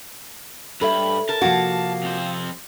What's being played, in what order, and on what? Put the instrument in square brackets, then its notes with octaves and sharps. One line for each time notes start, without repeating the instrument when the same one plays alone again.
[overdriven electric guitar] G2 [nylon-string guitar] A4 C#5 E5 [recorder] B5
[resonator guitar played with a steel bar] A#4 [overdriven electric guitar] A5
[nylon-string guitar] C3 F3 [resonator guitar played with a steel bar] A#3 F#4 [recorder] F5
[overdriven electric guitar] F2 C5